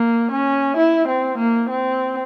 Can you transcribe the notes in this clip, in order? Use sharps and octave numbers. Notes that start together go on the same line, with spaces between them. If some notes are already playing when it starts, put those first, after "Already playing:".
Already playing: A#3
C#4
E4
C4
A#3
C4